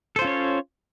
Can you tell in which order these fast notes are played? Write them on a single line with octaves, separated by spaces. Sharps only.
A4 C5 F4 C#4 C#5